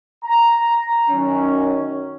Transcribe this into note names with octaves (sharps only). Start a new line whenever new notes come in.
A#5
F#2 D#3 F#3 C#4